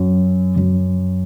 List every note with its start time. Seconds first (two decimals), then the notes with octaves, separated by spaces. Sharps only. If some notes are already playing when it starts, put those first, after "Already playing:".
Already playing: F#2
0.56 F#2